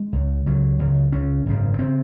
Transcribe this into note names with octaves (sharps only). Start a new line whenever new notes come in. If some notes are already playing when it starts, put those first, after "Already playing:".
Already playing: G#3
C#2 C#3
C#2 C#3 F#3
C#2 C#3
C#2 C#3 C#4
G#1 F#2 C#3
C#3 C4